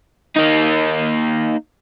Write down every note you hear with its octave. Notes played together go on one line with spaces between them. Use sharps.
A#3 D#4